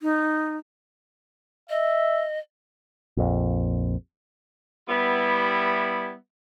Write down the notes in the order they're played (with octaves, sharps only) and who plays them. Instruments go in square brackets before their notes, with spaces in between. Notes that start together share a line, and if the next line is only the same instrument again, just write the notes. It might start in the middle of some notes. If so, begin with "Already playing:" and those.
[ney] D#4
[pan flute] D#5 [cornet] E5
[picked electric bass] A#1 F2
[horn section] G3 B3 E4